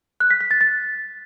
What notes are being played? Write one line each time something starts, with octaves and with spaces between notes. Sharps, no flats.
F#6
B6
B6
A6
A6